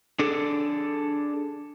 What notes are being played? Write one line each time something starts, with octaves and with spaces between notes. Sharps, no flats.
D4 G#4 A4